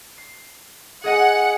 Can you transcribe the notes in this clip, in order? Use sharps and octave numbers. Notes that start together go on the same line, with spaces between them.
C7
G#4 D#5 F#5 G#5